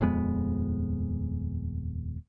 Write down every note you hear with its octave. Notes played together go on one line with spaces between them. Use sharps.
D#1 F2 G#3 B3